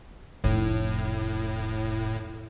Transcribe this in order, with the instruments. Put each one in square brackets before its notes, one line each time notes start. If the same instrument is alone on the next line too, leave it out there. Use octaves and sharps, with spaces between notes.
[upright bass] F1 C#3 [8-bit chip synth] A2